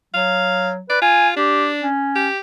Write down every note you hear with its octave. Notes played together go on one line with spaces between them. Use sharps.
F#3 F5
B4 D5
F4 G#5
D4 G4
C#4
G4